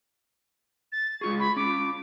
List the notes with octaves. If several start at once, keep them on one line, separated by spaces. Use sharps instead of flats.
A6
G#3 F4 G#4 C#6
B5
C#4 F4 D6